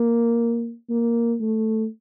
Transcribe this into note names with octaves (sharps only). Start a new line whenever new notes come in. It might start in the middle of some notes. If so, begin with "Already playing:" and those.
Already playing: A#3
A#3
A3